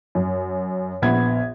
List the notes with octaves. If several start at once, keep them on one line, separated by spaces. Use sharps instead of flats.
F#2
A#1 B3 G#6